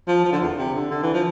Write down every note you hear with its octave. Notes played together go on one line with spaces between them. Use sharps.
F3
F3
D3
E2
C3
D3
D3
E3
F3